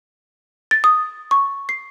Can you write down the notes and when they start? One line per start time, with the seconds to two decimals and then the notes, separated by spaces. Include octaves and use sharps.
0.71 A6
0.84 D#6
1.31 C#6
1.69 C7